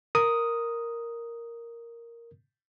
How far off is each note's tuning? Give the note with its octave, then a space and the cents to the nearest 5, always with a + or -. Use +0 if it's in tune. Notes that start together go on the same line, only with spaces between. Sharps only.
A#4 +0 D#6 +0